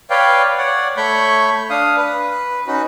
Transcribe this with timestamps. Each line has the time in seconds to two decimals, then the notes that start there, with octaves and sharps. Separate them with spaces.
0.10 B4 C#5 D5 F5 G5
0.58 C#5 D5 F#5
0.97 A3 C#5 B5 C#6 G6
1.70 D4 F5 D#6
1.97 B4
2.67 C#4 D#4 F#4 B4